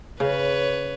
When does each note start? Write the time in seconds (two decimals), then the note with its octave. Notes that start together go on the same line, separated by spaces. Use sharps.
0.20 C#3 B4 C#5